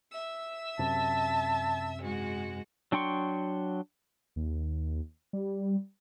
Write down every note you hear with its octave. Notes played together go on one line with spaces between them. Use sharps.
E5 E6
F#2 C3 A5
G#2 G#3 F#4
F#3 D4 G5 C6 C#6
D#2
G3